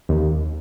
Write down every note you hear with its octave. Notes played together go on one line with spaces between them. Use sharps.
D#2